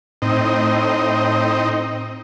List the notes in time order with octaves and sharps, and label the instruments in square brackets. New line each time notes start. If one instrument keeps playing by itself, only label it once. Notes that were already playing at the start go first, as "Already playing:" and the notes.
[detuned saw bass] A2 [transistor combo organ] C4 D#4